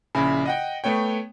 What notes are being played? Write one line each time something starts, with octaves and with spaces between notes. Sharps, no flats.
A#1 C#3 E4 G#5 B5
D#5 F#5 G5
A3 B3 C#5 G5